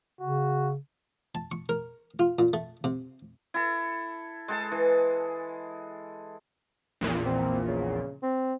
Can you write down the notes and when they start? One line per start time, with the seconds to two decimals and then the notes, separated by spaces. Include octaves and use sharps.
0.21 C#3 F#4
1.35 A5
1.52 C#6
1.69 A#4
2.19 F4
2.39 A#2
2.53 A3
2.84 C3
3.54 E4 A4
4.48 G#3 A4 A5
4.72 E3
7.01 A#1 E2 A#2
7.25 C4
7.68 C#3
8.22 C4